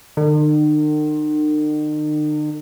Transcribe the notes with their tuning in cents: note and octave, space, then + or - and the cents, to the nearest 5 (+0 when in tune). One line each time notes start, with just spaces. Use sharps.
D#3 -45